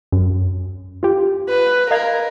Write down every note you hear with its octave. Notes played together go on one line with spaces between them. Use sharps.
F#2
F4 G4
B4
A#4 D#5 F5 G#6